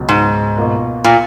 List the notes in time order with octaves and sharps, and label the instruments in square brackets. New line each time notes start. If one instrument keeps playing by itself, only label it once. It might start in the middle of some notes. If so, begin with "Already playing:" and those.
Already playing: [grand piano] C#2 B2 F#3
[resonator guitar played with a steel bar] G#2
[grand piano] B2 A#3 F4 A#4
[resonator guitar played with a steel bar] A#2